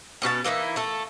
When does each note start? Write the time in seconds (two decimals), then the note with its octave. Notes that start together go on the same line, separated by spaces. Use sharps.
0.22 B2 C#4 G4 A5
0.44 E3 A#3 D#4 E4
0.76 A3 A4